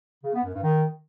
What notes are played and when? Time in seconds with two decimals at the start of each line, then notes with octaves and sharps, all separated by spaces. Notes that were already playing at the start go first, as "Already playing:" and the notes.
0.24 C#3
0.33 B3
0.43 F#2
0.53 G2
0.63 D#3